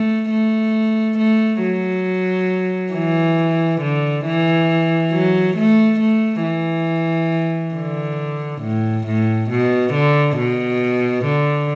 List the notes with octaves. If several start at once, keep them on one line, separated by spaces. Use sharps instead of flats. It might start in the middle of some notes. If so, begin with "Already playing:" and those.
Already playing: A3
A3
A3
F#3
E3
D3
E3
F#3
A3
A3
E3
D3
A2
A2
B2
D3
B2
D3